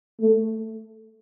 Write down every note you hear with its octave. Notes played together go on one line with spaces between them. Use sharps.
A3